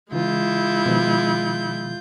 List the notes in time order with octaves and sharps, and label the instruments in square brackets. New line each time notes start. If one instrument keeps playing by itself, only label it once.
[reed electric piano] C#3 E3 [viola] G#3 E4 [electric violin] F4 G6
[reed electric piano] B2 D#3 F3